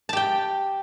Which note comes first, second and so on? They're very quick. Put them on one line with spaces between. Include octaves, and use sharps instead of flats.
A5 G4 G5